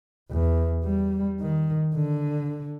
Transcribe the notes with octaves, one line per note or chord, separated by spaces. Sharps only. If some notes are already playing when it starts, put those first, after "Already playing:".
E2
G3
D#3
D3